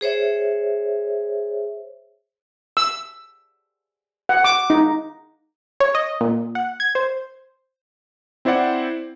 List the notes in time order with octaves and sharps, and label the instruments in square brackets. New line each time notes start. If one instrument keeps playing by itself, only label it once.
[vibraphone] G#4 C5 C#5 E5
[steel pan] E6
F#5
D6
D#4
[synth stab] C#5
D#5
A#2
F#5
G#6
C5
[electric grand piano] C4 E4 C5 D5 F#5